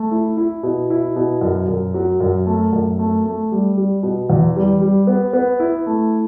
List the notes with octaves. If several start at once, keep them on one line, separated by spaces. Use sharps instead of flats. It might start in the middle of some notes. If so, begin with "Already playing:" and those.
Already playing: A3
E4
E4
B2
E4
B2
F#2
F#2
F#3
F#2
A3
F#2
A3
A3
G3
G3
B2
E2
G3
G3
B3
B3
E4
A3